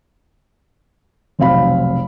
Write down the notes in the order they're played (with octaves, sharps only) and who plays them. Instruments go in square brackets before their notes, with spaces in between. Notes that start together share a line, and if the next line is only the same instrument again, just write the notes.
[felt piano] F1 B1 C4 F5 B5